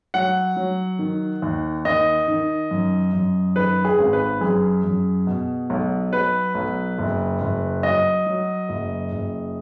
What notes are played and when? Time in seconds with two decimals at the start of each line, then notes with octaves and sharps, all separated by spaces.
0.14 F#3 F#5
0.56 F#3
0.99 D#3
1.42 D#2
1.85 D#3 D#5
2.28 D#3
2.71 F#2
3.13 F#2
3.56 D#3 B4
3.85 G#4
3.99 G#1
4.13 B4
4.41 F#2 G#4
4.84 F#2
5.27 B2
5.70 B1
6.13 F#3 B4
6.55 B1
6.98 F#1
7.41 F#1
7.83 F#3 D#5
8.26 F#3
8.69 F#1
9.12 F#1